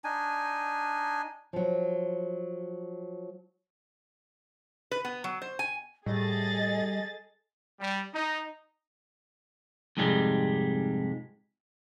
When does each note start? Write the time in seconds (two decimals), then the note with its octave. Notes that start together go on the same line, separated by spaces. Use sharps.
0.04 D4 D#4 G#5
1.53 F3 F#3
4.91 B4
5.05 B3
5.24 F#3
5.42 C5
5.59 G#5
6.06 A2 G3 G#4 A4 D#5 A6
7.80 G3
8.13 D#4
9.97 F2 G#2 C3 G3 G#3